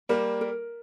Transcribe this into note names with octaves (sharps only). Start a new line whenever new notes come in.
G3 A#3 A#4
A#4